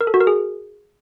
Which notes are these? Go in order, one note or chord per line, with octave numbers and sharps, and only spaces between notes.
A#4
A4
F#4
A#4
G#4